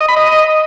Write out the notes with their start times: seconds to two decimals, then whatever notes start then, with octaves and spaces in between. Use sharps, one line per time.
0.01 D#5
0.08 B5
0.16 D#5